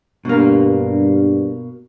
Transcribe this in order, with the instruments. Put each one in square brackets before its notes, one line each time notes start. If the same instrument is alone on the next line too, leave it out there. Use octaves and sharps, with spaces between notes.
[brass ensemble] G2 [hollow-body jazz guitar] B2 A#3